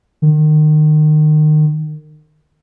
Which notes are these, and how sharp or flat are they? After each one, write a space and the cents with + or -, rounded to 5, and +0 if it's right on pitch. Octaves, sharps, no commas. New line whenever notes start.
D#3 -30